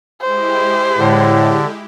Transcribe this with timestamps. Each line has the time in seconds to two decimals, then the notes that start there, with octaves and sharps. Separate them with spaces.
0.22 G#3 E4 G4 C5
0.98 A2 D3